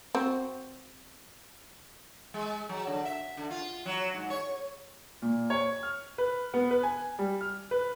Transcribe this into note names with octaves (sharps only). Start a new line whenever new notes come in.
C4 F#4
G#3
F#3
D3
E5
D3
F4
F#3
G#2
C#5
A#2
C#5
F6
B4
B3
B4
G#5
G3
F6
B4